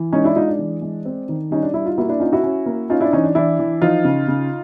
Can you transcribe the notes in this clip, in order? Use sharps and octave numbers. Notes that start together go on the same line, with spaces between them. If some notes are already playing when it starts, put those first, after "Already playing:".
Already playing: E3
G#3 C#4 D#4
D4 E4
G#3 D#4 F4
D4
E3
G#3
C4
D#3
G3 C#4 D#4
D4
G3 D4 E4
D#4 F4
A#3 E4 F#4
D4 E4
C#4 D#4 F4
E4 F#4
C#4
A#3
C#4 D#4 F4
D4 E4
E3 C#4 D#4
D4
E3 D4 E4
E3
F3 D#4 F4
C#3
C#3